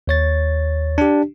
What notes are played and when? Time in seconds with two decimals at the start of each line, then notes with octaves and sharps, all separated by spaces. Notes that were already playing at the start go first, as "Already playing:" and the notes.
0.07 D#2 C#5 A6
0.98 D4 G4